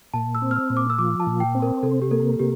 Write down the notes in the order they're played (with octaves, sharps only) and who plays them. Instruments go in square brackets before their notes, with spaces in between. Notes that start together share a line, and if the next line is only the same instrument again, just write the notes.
[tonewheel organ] A#2 [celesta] A5
[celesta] E6
[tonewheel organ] C4
[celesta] F6
E6
[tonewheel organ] A#2
[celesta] D6
E6
[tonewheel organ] F3 [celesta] D6
[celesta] A5
[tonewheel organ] A#2
[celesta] G5
[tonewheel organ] C4
[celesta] A#4
[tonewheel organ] C3 [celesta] A4
[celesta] G4
[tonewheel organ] A#3 [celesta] A4
[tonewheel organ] C3 [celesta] G4